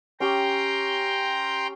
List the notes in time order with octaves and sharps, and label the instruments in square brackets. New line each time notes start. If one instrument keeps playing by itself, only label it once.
[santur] C#4 G4 [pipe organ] G5 A#5 C6